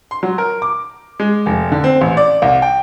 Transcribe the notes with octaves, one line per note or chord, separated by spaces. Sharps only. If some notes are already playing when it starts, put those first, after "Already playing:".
C6
F#3
A#4
D6
G#3
F1
D3
C4
A1
D5
C2
G5